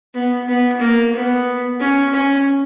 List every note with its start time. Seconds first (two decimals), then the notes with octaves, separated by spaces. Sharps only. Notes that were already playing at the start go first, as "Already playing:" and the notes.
0.14 B3
0.48 B3
0.80 A#3
1.13 B3
1.80 C#4
2.13 C#4